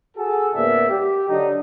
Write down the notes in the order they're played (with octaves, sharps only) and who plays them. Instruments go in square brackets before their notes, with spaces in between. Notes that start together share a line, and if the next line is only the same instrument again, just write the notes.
[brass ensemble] F#4 G#4 A4
G#2 C#3 A#3 B3 D5 E5
G4
D3 F#3 D#4